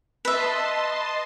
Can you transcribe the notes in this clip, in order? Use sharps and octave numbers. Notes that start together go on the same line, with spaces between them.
B4 D#5 E5 A5 C6